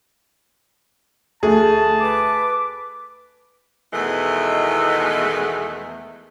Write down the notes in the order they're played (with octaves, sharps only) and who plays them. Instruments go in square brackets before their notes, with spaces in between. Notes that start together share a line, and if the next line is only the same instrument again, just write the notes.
[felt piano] D2 A3 [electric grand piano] G#4 [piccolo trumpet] A5
[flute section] B4 D6
[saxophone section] E2 B2 D#3 E3 G#3 A3